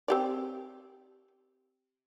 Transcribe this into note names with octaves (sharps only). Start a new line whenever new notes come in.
C4 G4 D5